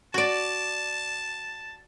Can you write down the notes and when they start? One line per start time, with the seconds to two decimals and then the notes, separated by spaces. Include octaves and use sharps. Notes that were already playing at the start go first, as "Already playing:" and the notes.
0.14 F#4 D5 A5